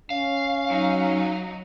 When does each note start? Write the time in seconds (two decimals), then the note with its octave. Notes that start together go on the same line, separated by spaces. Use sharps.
0.10 C#4 F5
0.67 F#3 D#4